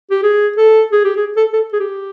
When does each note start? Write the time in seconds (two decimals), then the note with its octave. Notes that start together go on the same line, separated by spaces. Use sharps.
0.11 G4
0.23 G#4
0.57 A4
0.92 G#4
1.04 G4
1.16 G#4
1.37 A4
1.53 A4
1.73 G#4
1.80 G4